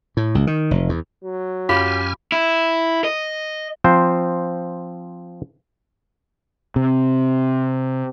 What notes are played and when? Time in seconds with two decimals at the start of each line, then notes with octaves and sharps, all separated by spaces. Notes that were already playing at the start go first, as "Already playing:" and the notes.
0.17 A2
0.35 C#2
0.47 D#3
0.71 F1
0.89 E2
1.24 F#3
1.69 F#2 F4 G4 G#5 B5 F6
2.32 E4
3.04 D#5
3.84 F3 C4 C5
6.76 C3